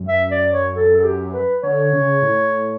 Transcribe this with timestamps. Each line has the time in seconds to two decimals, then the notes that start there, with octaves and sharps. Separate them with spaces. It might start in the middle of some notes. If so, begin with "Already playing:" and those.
Already playing: F#2
0.08 E5
0.31 D5
0.52 C#5
0.74 A4
0.97 A4
1.03 G4
1.33 B4
1.63 D3 C#5
1.93 C#3
2.22 A2